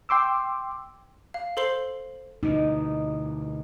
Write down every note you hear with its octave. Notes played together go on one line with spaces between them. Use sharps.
G5 C6 D6 E6
F5
A4 C5 C6 C7 F#7
D2 B2 E3 D#4